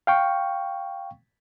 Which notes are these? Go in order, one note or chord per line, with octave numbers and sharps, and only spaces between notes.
F5 G5 C#6